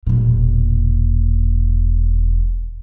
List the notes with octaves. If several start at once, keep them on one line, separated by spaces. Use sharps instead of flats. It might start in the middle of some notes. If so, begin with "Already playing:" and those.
E1 A#2